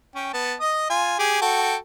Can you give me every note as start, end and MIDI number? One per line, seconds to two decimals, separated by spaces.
0.15 0.32 61
0.15 0.32 79
0.34 0.55 59
0.34 0.55 81
0.60 0.88 75
0.60 0.88 87
0.90 1.18 65
0.90 1.18 80
1.19 1.41 67
1.19 1.41 68
1.19 1.41 80
1.42 1.76 66
1.42 1.76 69
1.42 1.76 79